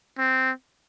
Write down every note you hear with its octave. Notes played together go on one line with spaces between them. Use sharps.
C4